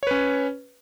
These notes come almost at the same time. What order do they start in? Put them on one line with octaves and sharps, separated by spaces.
C#5 B4 C#4